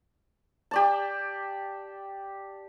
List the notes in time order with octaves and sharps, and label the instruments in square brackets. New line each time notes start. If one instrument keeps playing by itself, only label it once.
[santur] G4 D5 A5